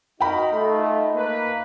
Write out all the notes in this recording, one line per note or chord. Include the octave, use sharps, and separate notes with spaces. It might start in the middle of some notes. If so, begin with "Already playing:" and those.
D#4 F#4 A#4 G5 B5
A3 F4
A#3 B4